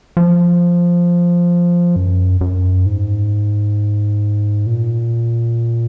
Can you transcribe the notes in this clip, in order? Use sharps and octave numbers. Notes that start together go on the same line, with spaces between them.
F3
F#2
F#2
G#2
A#2